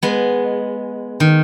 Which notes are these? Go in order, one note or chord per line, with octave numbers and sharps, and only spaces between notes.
G#3 B3
D#3